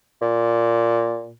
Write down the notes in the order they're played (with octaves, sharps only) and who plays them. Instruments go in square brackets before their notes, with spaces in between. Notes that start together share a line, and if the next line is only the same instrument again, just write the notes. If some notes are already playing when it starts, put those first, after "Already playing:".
[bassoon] A#2